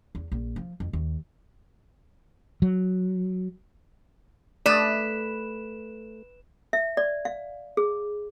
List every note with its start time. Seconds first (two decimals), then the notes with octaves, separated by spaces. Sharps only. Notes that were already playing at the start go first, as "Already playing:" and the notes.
0.15 E2
0.32 A#1
0.56 F3
0.80 F2
0.93 D#2
2.62 F#3
4.66 A3 B4 D5 D#6 E7
6.73 E5
6.97 D5
7.25 F5
7.77 G#4